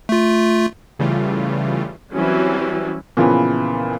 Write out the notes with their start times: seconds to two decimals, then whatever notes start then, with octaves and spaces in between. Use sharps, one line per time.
0.09 A3 F4
0.99 C#3 E3 G3 A3 F4
2.12 E3 F#3 G3 C4 C#4
3.17 A#2 C#3 E3 F3 B3